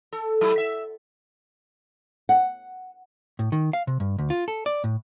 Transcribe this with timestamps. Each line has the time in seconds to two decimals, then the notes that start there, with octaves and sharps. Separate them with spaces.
0.13 A4
0.41 F#3 A3 E4
0.58 E5
2.29 F#5
3.39 A2
3.52 D#3
3.73 F5
3.87 C3
4.00 G2
4.18 D2
4.30 F4
4.48 A4
4.66 D5
4.84 A2